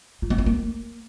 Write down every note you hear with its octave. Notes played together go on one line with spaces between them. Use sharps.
F4
B3
C4
A#3